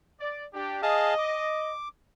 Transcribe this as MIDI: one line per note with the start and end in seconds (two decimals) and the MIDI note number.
0.20 0.45 74
0.54 0.80 62
0.54 0.80 67
0.82 1.14 68
0.82 1.71 75
0.82 1.14 77
0.82 1.14 81
1.18 1.88 86